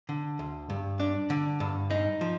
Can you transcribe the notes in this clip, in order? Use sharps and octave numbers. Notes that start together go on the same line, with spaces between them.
D3
D2
G2
D4
D3
G2
D#4
F3